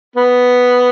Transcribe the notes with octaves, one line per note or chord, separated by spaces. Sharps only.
B3